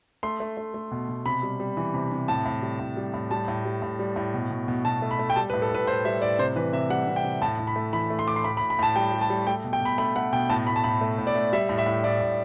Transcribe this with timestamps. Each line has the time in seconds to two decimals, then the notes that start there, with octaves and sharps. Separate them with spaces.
0.23 A3 C6
0.40 A3
0.57 A3
0.74 A3
0.91 B2
1.09 B2
1.26 C3 B5
1.43 G3
1.60 G3
1.77 E3
1.94 C3
2.11 C3
2.28 A2 A5
2.45 A2
2.62 G3
2.80 A2
2.97 G3
3.14 A2
3.31 G3 A5
3.48 A2
3.65 G3
3.82 A2
3.99 G3
4.16 A2
4.34 B2
4.50 B2
4.68 B2
4.85 B2 A5
5.02 A3
5.11 B5
5.19 A3
5.30 G5
5.36 G3 A5
5.50 B4
5.54 A2
5.62 A4
5.70 A2 B4
5.87 A2 C5
6.05 G3 E5
6.22 A2 D5
6.39 C3 C5
6.56 E3 B4
6.73 C3 E5
6.90 G3 F#5
7.08 C3
7.16 G5
7.24 C3
7.42 A2 A5
7.59 A2
7.67 B5
7.76 A3
7.93 E3 B5
8.10 A3
8.19 C6
8.27 A2 D6
8.36 C6
8.44 A2 B5
8.57 B5
8.61 A2
8.70 B5
8.79 A2 A5
8.96 G3 G5
9.13 G3
9.21 A5
9.30 G3
9.47 A3 G5
9.64 B2
9.73 G5
9.81 B2 B5
9.98 A3 B5
10.16 A3 F#5
10.33 B2 G5
10.50 A2 A5
10.67 A2 B5
10.76 A5
10.84 A2 B5
11.01 A3
11.18 A2
11.27 D5
11.35 A3
11.53 G3 E5
11.69 A2
11.78 E5
11.87 A2
12.04 A2 D5
12.21 A2